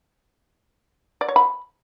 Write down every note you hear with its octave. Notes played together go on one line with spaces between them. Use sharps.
D5
C#5
B5